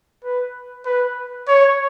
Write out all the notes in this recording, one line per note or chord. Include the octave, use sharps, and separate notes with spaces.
B4
B4
C#5